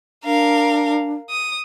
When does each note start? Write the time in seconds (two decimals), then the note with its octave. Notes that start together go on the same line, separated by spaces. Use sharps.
0.24 D4 A#4 F5
1.30 D#6